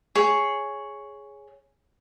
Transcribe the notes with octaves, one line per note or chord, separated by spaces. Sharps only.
G#4 C#5